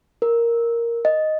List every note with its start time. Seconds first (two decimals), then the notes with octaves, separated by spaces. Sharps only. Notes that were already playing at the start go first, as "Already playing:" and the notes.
0.22 A#4
1.05 D#5